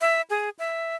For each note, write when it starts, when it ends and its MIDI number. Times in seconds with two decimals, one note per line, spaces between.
0.01 0.21 76
0.30 0.49 68
0.59 0.96 76